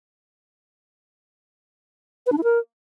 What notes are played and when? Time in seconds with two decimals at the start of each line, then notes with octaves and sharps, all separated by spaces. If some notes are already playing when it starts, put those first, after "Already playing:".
2.27 B4
2.32 D4
2.38 E4
2.44 A#4